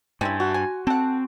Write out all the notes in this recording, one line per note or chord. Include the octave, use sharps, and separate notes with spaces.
G2 C#4 E4 G5 G#5 C6
A3 F#4
G#5
C4 A4 F#5